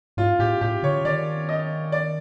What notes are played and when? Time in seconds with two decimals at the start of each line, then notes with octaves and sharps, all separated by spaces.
0.17 G#2 F4
0.39 A2 G4
0.61 A2 G4
0.83 D3 C#5
1.05 D#3 D5
1.49 D#5
1.92 D5